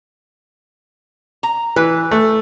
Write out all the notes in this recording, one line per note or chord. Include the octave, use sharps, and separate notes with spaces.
A#5
E3 B4
A3